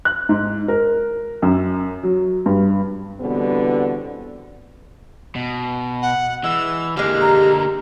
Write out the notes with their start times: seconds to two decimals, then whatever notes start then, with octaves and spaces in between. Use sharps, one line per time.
0.05 F#6
0.29 G#2
0.68 A#4
1.42 F#2
2.03 F#3
2.46 G2
3.21 E2 B2 D3 G3 B3 C4
5.35 B2
6.02 F#5
6.44 E3 G#3 E6
6.97 D3 G#3 A#3 G4 F6
7.21 A#5